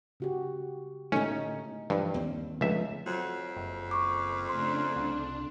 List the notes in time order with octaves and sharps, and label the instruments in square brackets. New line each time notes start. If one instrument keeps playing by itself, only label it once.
[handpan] C#3 F#4 G4
[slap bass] A2 D3 A3 [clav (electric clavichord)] C#4 [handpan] D#4
[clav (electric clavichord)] G2 [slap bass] E3 F3
[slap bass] D#2 C4
[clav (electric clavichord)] C#2 E5 [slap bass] D3 A3 [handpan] F3
[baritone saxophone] F2 [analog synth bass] F#3
[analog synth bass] F#1
[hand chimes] C#6 D6
[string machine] C#3 A3 D4 [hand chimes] C6
[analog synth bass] C2 [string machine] D4